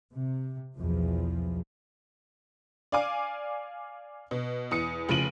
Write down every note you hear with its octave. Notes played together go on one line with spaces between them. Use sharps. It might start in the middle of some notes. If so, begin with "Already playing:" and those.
C3
B1 E2 F3
D5 F5 G#5 D6
B2
E2 D#6 C#7
F1 C#3 F3 D7 D#7 F#7